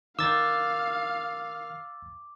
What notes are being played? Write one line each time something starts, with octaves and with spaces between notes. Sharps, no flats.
D#3 A#4 F5 D6 E6 G6 A6